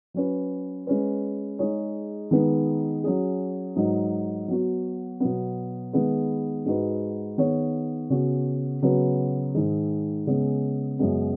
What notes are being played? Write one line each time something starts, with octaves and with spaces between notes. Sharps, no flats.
F#3 C#4 B4
G#3 C#4 B4
G#3 D#4 G#4 C#5
D#3 G#3 B3 D#4 B4
F#3 C#4 G#4
G#2 F#3 D#4
F#3 B3 F#4
B2 F#3 B3
D#3 G#3 B3 G#4 B4
G#2 G#3 D#4 F#4 B4
D#3 B3 G#4 C#5
C#3 B3 F#4
C#3 F#3 B3 F#4 B4
G#2 D#3 G#3
C#3 G#3 B3
F#2 C#3 G#3 B3